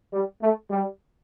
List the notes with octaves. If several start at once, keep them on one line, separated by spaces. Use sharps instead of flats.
G3
A3
G3